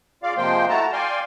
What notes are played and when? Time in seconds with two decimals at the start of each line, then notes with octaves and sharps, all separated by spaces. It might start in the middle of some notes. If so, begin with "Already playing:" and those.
0.23 C#3 F4 D5 F5
0.37 C3 F3 G#3 A#3 C5 G5
0.69 A3 E4 F#4 A5 A#5
0.93 D5 F5 G5 G#5 C6